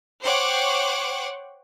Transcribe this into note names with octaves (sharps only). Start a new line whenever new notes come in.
C5 C#5 F#5 G5 C#6 D6